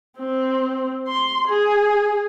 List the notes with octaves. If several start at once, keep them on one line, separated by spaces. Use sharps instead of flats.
C4
C6
G#4